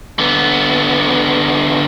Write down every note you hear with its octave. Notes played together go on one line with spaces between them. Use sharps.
D3 B3